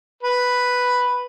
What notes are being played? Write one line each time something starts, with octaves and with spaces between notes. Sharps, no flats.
B4